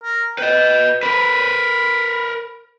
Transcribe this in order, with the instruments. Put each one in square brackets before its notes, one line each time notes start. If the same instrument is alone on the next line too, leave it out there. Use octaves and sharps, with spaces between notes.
[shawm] A#4
[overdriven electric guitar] B4 D#5 [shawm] G5
[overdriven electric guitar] A#4 B4 [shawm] B5